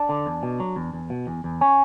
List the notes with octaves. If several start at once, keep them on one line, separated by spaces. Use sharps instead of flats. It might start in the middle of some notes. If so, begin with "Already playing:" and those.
Already playing: D4
D3
E2
B2
F#3
E2
E2
B2
E2
E2
C#4